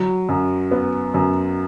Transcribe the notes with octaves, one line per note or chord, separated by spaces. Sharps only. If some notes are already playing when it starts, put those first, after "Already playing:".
Already playing: F#3
F#2
B3
F#2